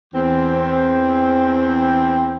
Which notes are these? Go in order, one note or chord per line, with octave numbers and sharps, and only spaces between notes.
E2 C4